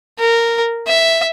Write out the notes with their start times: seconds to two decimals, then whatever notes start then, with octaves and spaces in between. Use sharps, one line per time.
0.19 A#4
0.87 E5